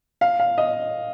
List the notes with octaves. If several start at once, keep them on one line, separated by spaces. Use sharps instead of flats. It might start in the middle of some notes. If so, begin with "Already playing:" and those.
F5
F5
D#5